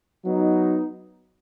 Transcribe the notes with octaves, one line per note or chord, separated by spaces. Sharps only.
F#3 B3 D#4